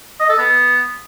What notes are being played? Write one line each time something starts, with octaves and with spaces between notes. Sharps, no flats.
D#5
A4
B3